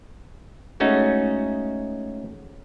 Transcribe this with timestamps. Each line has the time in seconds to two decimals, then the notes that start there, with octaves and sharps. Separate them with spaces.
0.80 G#3 A3 C#4 D#4 F#4